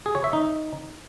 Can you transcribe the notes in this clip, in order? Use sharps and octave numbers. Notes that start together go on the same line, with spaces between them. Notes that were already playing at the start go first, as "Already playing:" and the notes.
G#4
C#5
E5
D#4